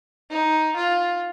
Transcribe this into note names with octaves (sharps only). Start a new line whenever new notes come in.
D#4
F4